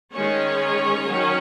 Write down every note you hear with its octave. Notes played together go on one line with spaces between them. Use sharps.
D#3 G#3 C#4 C#5
D#3 F#3 C#4